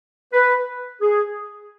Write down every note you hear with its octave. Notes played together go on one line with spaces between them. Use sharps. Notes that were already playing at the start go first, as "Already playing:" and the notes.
B4
G#4